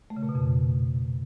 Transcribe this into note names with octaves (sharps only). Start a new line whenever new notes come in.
A3
C#3
A#2
B2
F2